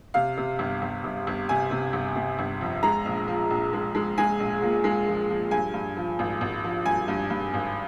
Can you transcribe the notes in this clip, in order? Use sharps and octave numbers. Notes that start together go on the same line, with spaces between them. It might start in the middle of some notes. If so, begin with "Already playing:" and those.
C3 F5
C3
G1
G1
G1
G1
C3 G#5
C3
G1
C3
G1
F2
G#3 A#5
A#1
F3
A#1
G#3
G#3
G#3 G#5
A#1
A#2
G#3
F3
F3
G2 G#5
G2
F3
G#1
G#1
F3
G2 G#5
G2
G2
G#1